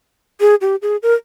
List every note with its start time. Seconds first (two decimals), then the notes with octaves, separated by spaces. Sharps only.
0.41 G#4
0.61 G4
0.82 G#4
1.03 A#4